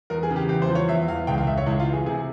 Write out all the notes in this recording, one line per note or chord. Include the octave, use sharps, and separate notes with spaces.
E2 A#4
G#4
C#3
G4
E2 G4
C5
F3
C#5
E2 E5
E2 F5
C#2 G5
F5
C#2 E5
C#5
C#2 E4
F4
E3
G#4
C3 G#4